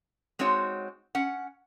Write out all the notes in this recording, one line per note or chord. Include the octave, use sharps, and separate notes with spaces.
G#3 C4 D#4 F#4 C#5
C#4 F#5